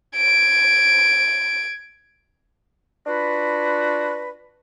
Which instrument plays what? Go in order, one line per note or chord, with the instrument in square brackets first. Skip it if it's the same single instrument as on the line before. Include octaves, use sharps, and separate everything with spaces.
[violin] G#6 D7
[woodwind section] D4 F4 F#4 B4